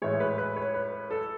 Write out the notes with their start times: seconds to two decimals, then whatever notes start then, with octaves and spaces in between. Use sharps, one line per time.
0.02 A2 E3 G#3 C#5
0.20 B4
0.38 B4
0.56 C#5
0.74 B4
1.11 A4